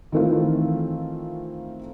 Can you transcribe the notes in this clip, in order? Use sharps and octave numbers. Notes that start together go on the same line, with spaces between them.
D#3 E3 A3 C4 D#4 F4